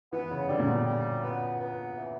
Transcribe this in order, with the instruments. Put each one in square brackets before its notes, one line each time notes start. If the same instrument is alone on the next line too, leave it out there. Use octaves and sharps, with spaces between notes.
[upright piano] E3 [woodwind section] B3
[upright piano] C#3
[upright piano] D3 [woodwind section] G3
[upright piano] A#2
B2
[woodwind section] G3
B3
B3
E3